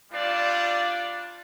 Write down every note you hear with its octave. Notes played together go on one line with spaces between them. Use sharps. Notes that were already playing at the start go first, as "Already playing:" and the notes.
G3 D4 F4 D5